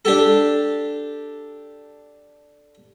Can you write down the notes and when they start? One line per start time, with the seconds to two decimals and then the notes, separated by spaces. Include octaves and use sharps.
0.05 D4 G4 A4